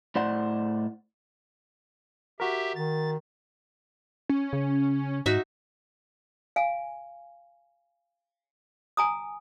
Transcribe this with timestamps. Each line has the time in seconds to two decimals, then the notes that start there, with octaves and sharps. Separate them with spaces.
0.16 A2 C5 D5 F#5
2.40 F#4 G4 A#4 E5
2.75 D#3 A6
4.29 C#4
4.53 C#3
5.26 G#2 D#4 F#4 E5
6.56 F5 G#5
8.97 G#5 A#5 D#6